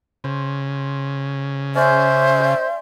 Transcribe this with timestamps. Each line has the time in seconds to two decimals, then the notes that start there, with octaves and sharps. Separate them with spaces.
0.24 C#3 C5
1.75 C#4 G#4 C5 D5 E5
2.40 G5 C6